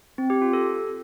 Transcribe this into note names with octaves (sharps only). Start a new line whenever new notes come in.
C4
G4
F4
A4